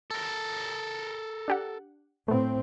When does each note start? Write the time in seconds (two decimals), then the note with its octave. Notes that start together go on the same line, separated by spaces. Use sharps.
0.11 A4 A#4
1.48 D4 G4 F#5
2.28 A2 A3 B3 C4